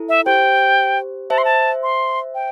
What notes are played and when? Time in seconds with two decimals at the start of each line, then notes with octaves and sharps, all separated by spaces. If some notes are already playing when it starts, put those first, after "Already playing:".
Already playing: E4 A4
0.09 E5
0.26 G4 C5 G5
1.30 C5 E5 A5
1.38 C6
1.45 A5
1.83 C6
2.35 G5